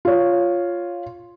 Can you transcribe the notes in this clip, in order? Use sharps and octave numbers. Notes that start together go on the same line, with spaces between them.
F4 C#5